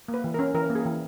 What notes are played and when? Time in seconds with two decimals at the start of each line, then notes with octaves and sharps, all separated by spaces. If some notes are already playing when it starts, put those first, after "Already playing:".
0.08 A#3
0.14 B4
0.24 E3
0.34 C#4 A#4
0.54 E3 A#4
0.70 A#3
0.75 G#4
0.85 E3